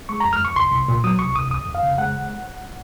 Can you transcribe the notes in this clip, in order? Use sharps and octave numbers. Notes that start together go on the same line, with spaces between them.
G#3 C#6
F2 A#5
F6
F2 C#6
C2 C6
C2
A#2
F#3 D#6
C2 C#6
C2 D#6
F2 D#6
F2
F5
C#3
G#3 F#5